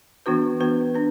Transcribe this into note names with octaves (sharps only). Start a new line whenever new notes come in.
E3 B3 D4 F#4 B4
E3 B3 D4 F#4 B4
D4 B4